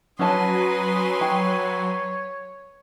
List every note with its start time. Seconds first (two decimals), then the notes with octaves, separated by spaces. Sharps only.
0.19 F#3 C#4 B4 G#5 A5 C6 D#6
1.21 C#5 G5